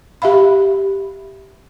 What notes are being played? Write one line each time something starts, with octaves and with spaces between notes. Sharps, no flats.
G4 E5 F5 B5